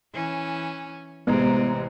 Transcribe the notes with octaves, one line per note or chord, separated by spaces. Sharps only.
E3 C#4
A1 C3 G#3 B3 A#5